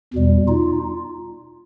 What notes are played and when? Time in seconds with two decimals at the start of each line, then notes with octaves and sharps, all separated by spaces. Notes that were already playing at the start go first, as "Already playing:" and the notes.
0.13 E2 B2 G3
0.48 D#4 F4